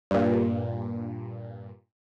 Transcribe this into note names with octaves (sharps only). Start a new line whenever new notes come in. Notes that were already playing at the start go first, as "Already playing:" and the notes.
G2 A#2